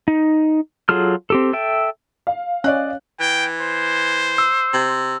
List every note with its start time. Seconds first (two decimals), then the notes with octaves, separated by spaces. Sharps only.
0.08 D#4
0.89 F#3 F4 G#4 A4 F6
1.30 C4 G4 A4
1.53 A4 E5 G5
2.27 F5
2.64 C#4 D5 D#5 F#6
3.20 E3 G5
3.61 C5
4.38 E6
4.73 C3